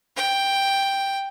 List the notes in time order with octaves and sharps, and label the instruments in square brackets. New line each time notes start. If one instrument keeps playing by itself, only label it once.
[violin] G5